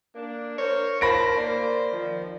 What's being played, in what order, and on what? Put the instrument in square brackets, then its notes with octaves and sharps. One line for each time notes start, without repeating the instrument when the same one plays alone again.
[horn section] A#3 D4
[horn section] A#4 C5 [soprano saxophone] C#5
[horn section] F4 A5 [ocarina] A#4 [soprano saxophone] C5 [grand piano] B5 A#6 D7
[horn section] A#3 [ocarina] D5
[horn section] D#3 F3